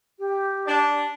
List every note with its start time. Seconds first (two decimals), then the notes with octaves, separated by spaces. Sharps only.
0.19 G4
0.66 D4